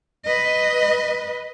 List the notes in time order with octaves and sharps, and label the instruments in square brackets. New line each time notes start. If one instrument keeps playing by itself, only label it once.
[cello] B4 D#5